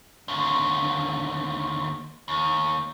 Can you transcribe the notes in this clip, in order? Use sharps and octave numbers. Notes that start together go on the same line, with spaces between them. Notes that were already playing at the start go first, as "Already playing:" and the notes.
D#2 D3
D#2